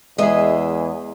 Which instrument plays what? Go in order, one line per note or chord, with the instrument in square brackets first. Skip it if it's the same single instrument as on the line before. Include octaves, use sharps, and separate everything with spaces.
[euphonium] E2 [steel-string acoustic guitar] G#3 E5 [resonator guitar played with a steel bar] G#4 D#5